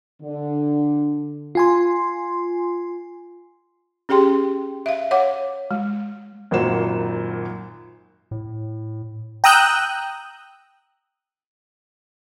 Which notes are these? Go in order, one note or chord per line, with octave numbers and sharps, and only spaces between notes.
D3
F4 G#5 C6
C#4 G4 G#4 G5 C6
E5 F5
C#5 F#5 D6
G#3
G#1 F#2 A#2 F#4 C5 E7
A2
G5 A#5 D#6 E6 F#6 G6